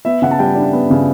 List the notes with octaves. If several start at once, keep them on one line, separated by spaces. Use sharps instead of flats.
B3 E5
C#3 F#5
A5
G3 G5
D4
B3
C#3